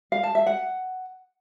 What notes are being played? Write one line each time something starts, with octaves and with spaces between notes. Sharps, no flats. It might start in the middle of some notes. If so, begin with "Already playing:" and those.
F5
A5
E5
F#5